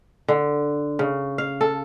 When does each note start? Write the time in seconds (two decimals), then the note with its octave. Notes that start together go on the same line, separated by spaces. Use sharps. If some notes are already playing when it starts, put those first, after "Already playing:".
0.28 D3
0.99 C#3
1.38 F5
1.61 A4